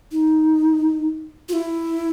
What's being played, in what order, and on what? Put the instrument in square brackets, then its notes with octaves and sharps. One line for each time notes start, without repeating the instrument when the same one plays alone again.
[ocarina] D#4
F4
E4